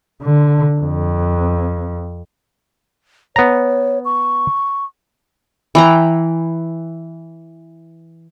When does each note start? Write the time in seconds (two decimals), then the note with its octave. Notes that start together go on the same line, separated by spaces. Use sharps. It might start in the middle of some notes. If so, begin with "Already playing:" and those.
0.22 D3
0.80 F2
3.36 B3 C#5 A#5
4.05 C#6
5.75 E3 G5 A#5